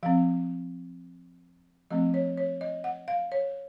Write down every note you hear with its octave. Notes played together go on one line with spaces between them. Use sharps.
F3 C4 F5
F3 A3 C4 D#5
C#5
C#5
D#5
F#5
F5
C#5